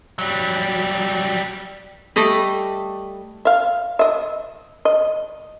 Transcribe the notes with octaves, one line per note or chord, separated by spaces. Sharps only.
F#3 G3
G3 A3 D#5 B5
E5 F5
D#5 E5
D#5